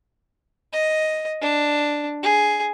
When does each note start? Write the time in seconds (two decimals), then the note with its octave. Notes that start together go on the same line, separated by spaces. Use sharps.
0.72 D#5
1.42 D4
2.23 G#4